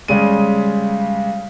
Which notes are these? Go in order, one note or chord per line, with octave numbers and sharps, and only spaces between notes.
C#3 G3 G#3 D#7